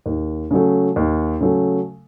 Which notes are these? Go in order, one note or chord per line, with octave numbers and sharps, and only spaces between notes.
D#2
C#3 F#3 A3
D#2
C#3 F#3 A3